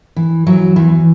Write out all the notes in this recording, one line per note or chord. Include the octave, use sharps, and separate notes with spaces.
E3
E3 F#3
E2 E3